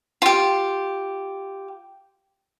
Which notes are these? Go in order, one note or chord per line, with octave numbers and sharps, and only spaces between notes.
F4 G4